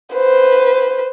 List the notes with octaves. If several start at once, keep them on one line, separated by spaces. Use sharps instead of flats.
B4 C5